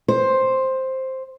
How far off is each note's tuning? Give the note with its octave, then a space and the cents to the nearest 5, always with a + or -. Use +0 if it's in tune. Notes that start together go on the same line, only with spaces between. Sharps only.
C5 +5